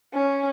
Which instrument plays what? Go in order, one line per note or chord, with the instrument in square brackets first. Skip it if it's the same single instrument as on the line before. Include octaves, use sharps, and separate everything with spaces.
[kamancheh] C#4